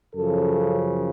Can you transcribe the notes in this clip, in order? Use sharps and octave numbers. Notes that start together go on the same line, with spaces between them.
F#2 C#3 F3 A4